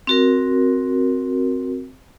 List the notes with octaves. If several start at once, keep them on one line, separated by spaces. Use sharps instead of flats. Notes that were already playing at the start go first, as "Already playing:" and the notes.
C4 F#4 A#4